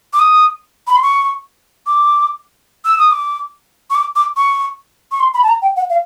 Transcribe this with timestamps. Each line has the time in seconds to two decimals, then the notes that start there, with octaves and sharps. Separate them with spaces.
0.13 D6
0.19 D#6
0.87 B5
0.95 C6
1.02 C#6
1.87 D6
2.85 E6
2.98 D#6
3.11 D6
3.90 C#6
3.95 D6
4.16 D6
4.37 C#6
5.12 C#6
5.20 C6
5.34 B5
5.43 A5
5.48 A#5
5.62 G5
5.76 F#5
5.90 F5